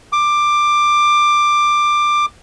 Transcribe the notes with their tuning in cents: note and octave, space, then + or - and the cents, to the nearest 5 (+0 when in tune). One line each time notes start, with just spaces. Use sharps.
D6 +15